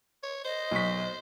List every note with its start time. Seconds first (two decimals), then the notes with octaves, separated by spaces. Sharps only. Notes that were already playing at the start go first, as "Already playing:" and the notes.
0.23 C#5
0.45 C5 D#5
0.71 B1 C#6 B6